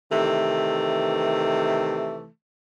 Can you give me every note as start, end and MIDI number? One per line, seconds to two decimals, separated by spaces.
0.12 2.27 48
0.12 2.27 51
0.12 2.27 52
0.12 2.27 57